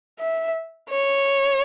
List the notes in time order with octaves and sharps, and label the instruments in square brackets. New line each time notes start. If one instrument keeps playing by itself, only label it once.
[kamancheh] E5
C#5